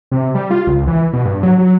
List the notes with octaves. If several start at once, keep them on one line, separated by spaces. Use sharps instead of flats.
C3
G3
F4
C#2
E3
B2
G2
F#3
F#3